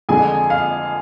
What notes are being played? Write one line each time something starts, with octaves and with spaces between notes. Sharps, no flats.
F2 D3 G#3 G#4 G#5
F5